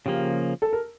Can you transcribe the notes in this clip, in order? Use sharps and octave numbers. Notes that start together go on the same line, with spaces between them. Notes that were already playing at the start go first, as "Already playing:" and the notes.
C#3 F3 A#3 G4
A4
A#4